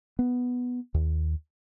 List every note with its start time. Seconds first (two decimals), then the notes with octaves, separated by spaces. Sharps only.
0.19 B3
0.94 D#2